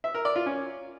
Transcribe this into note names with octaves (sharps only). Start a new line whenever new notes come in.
E5
A#4
D5
F4
C#4